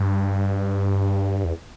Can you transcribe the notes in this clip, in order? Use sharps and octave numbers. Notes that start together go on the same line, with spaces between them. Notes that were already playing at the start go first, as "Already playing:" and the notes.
Already playing: G2
E2